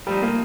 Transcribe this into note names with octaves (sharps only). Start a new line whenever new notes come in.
A2 F3 G3 C4 D#4
A#3